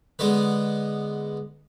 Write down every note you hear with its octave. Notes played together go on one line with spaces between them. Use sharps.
D3 G#3 B3 B4